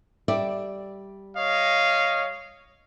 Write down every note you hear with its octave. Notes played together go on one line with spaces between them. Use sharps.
G3 D5 E5
C#5 D#5 F5